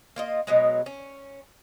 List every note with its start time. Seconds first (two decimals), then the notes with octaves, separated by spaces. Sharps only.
0.16 A#3 F4 D#5
0.47 B2 F#3 G#3
0.86 C#4